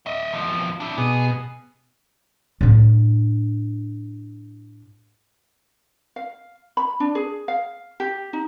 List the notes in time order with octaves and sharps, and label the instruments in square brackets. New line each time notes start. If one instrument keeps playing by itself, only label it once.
[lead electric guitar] D#5 E5
E2 F3
D4 E4
[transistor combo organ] B2 [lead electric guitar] G#4
[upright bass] A2 D4
[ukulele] F5
B5
D4
G#4
F5
G4
D#4